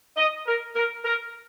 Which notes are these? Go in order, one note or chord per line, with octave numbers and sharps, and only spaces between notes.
D#5
A#4
A#4
A#4